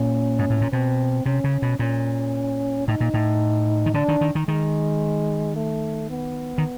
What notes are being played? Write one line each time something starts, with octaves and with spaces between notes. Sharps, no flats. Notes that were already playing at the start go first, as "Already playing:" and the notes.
Already playing: A#2 C#4
G#2
A2
A#2
B2 C4
C3 C#4
C#3
B2
A#2 C#4
A2 D#4
A#2
A2
D#3
D3 D4
D#3
D#3
D#3
D#3 G#3
A3
B3
D#3